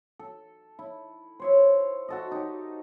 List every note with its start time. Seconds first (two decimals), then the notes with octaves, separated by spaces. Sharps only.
0.19 A4
0.79 E4
1.40 C5 C#5 E5
2.08 F#4 A4 D#5
2.31 D#4 G4